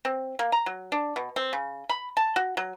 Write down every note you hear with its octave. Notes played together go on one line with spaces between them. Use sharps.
C4
A#3
A#5
F#3
D4
B2
C4
C#3
B5
A5
F#4
F#3